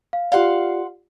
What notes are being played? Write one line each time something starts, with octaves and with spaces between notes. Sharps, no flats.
F5
F4 G4 D5 F5 F#5 C6